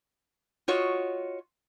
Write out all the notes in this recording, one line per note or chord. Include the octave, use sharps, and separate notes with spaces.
F4 F#4 C#5 D#5